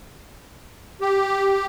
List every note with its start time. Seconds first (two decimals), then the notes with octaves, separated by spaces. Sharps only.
1.01 G4